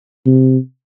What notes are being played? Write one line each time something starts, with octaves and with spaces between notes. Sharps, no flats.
C3